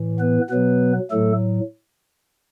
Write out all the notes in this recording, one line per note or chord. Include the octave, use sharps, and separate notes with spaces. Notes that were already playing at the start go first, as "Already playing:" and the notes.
Already playing: A2 E3
B3 B4
B2 F#3 B3 B4
A2 F#3 A3 A4